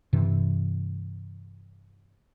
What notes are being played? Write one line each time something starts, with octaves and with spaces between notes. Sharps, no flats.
G2 C3 E3